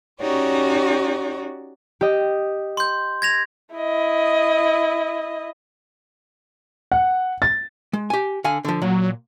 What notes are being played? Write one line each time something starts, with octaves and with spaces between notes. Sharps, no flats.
C#4 D#4 F#4 G4 C#5 D5
G4 D#5
C6 G6
G#6 A#6 F7
E4 D#5
F#5
A6
G#3
G4 G#5
D3 F5 G#5
D3 F3
A#2 F#3